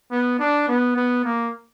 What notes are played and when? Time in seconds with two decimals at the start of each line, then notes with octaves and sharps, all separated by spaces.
0.11 B3
0.40 D4
0.68 B3
0.96 B3
1.24 A#3